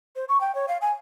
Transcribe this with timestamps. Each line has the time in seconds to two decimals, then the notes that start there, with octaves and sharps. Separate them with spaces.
0.16 C5
0.29 C#6
0.41 G5
0.55 C#5
0.68 F5
0.81 G#5